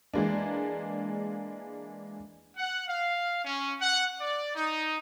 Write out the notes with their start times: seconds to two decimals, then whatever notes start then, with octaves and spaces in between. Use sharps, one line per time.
0.14 E3 G#3 A#3 D4
2.57 F#5
2.87 F5
3.44 C#4
3.80 F#5
4.20 D5
4.55 D#4